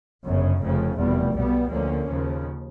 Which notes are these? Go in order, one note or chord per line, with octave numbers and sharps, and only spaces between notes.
G1 F#2 C#3
F1 F2 C#3 F3
F1 E2 B2 G3
B1 B2 G3 B3
D2 D3 F3 A#3 C#4
D#2 C#3 F3